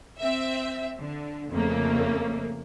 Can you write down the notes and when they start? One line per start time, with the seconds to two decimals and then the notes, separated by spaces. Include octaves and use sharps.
0.19 C4 E5
0.98 D3
1.50 F2 C#3 A3 A#3